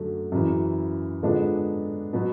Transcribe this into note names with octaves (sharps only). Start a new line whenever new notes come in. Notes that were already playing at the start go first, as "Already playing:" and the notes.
Already playing: F#2 D3 F#3 A3
F#2 C#3 E3
D3 F3 G#3 B3 D4
B2 F#3 B3